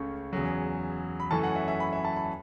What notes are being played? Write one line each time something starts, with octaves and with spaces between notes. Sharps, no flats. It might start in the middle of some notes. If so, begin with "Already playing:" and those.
Already playing: C#2 C#3 A3 C#4
E2 C#3 F#3
B5
F#2 E3 A3 C#4 A5
F#5
E5
E5
B5
E5
A5
B5